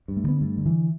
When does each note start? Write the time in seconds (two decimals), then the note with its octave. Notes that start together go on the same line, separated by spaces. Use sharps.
0.08 G2
0.17 A3
0.24 D3 B3
0.41 G2 A3
0.57 D3
0.66 E3